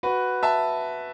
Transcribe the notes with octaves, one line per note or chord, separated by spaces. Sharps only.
F#4 B4
E5 A5